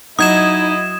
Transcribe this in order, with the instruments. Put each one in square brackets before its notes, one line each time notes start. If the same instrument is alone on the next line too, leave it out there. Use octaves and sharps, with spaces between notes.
[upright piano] F#3 [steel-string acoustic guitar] D#4 [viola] E4 D#5 [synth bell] D#6 G#6 E7